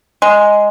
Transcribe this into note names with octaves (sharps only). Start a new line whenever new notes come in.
G#3